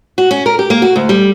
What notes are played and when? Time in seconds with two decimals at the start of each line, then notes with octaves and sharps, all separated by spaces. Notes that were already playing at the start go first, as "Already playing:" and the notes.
0.18 F#4
0.31 C#4
0.46 A#4
0.59 G4
0.70 A#3
0.82 F#4
0.96 D2
1.09 G3